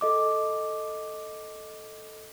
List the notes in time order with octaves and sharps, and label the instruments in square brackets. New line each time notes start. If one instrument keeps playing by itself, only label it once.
[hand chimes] A4 D#5 D6